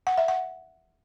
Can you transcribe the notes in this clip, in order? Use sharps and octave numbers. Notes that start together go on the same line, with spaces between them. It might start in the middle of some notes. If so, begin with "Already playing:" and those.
F#5
E5
F#5